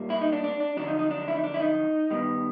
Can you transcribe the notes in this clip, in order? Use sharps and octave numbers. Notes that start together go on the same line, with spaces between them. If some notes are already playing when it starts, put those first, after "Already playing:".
Already playing: A#2 G3 A#3
E4
D#4
D4
D4
D4
F2 D3 F#3 D4
D#4
D#4
D4
E4
D#4
D4
E4
D#4
G2 D#3 G3 B3